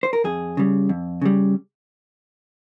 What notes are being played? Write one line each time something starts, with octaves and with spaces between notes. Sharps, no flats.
C5
A#4
F2 G#4
C#3 G3
F2
C#3 G3